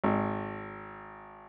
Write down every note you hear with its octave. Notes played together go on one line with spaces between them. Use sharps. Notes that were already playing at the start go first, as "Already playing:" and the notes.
G#1